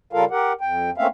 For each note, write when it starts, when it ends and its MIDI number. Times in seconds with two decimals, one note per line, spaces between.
0.13 0.25 49
0.13 0.25 55
0.13 0.25 65
0.13 0.25 69
0.13 0.25 70
0.13 0.25 77
0.31 0.53 67
0.31 0.53 70
0.31 0.53 78
0.61 0.90 41
0.61 0.90 79
0.98 1.07 57
0.98 1.07 58
0.98 1.07 60
0.98 1.07 61
0.98 1.07 76
0.98 1.07 77